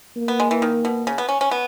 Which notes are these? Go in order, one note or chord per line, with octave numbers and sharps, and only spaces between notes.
A#3
B3
G#3
E3
D#3
B2
C#3
B3
C#4
C#4
B3